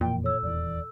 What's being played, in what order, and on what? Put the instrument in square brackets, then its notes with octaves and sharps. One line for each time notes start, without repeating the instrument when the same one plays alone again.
[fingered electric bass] E1 F2 E3 [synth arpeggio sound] A#2 [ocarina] G5
[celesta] A4 E6 [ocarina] C#5
[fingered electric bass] D#1 E2 E3 [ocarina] D5